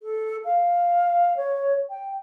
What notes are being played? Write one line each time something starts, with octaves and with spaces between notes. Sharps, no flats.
A4
F5
C#5
G5